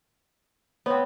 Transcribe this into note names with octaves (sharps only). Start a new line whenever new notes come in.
B3 C4 C5 C#5